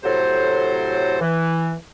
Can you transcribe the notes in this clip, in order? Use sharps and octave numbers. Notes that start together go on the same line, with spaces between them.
A2 C3 F#3 A4 C5
E3